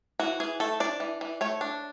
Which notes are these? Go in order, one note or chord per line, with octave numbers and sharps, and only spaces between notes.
E3 F#4
E3 G#4
A3 A4
D4 D5
E3
E3
A3 C#5
D4